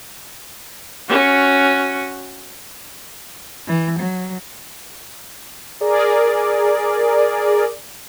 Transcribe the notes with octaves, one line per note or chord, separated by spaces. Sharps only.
C#4 F#4
E3
F#3
G#4 A#4 D5